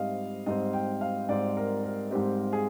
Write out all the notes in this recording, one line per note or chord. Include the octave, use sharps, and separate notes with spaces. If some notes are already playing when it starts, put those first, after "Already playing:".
Already playing: G#2 G3 C4 D#5 F5
G#2 G3 C4 D#5
G5
F5
G#2 G3 C4 D5
A#4
A#4
G#2 G3 C4 G4
G#4